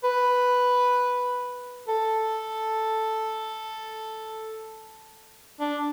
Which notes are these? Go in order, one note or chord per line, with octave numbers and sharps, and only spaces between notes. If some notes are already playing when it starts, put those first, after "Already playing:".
B4
A4
D4